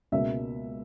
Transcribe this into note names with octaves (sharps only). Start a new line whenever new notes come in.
C#2 B2 A#3 E5